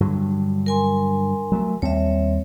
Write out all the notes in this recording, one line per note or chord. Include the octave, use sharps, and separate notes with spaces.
G2 D3 F#3
A#4 G#5 C6
F#3 G#3 A3
D#2 G3 C4 C#5 E5